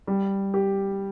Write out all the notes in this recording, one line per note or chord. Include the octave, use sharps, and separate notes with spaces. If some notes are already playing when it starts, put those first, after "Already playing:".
G3
G4